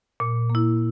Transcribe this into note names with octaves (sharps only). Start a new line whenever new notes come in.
A#2
A#3
E4